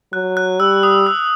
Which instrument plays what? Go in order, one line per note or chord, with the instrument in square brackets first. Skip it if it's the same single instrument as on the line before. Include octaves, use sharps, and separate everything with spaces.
[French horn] F#3 [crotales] F#6
[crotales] F#6
[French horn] G3 [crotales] E6
[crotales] D#6
E6